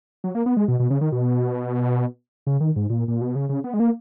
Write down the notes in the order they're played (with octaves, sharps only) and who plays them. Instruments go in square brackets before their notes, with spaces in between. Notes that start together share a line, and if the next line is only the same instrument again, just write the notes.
[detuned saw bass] F#3
A#3
B3
G#3
B2
B2
C#3
D#3
B2
C#3
D#3
G#2
A#2
A#2
B2
C#3
C#3
B3
G#3
A#3